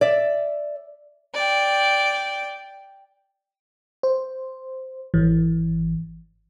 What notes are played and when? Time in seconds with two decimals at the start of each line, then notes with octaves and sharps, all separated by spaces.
0.01 D5 E5
1.34 D5 G5
4.03 C5
5.14 G#1 E3